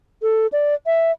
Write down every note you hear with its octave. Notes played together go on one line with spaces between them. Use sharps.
A4
D5
E5